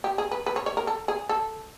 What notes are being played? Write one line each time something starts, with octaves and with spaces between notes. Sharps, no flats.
G4
G#4
B4
B4
C#5
C#5
A#4
A4
G#4
A4